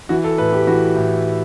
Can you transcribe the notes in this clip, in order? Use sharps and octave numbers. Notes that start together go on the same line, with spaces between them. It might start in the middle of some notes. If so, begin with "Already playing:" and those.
E3 F#4
A4
A2 B4
G4
E3 F#4
A2